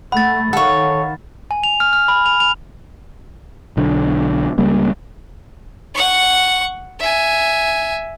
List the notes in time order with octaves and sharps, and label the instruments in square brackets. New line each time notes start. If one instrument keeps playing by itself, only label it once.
[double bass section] A3 [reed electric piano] F#5 [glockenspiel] B5 A6
[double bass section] D#3 [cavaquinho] A4 C#5 [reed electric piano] F5 F#5
[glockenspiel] G#5
F7
F6
F6
B5
F7
F7
[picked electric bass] B1 D3
C#2 C#3 G3 A#3
[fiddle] F#5 C#6
E5 G#5